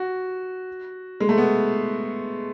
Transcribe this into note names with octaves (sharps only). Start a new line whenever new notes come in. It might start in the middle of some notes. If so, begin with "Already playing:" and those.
Already playing: F#4
G#3
A3
B3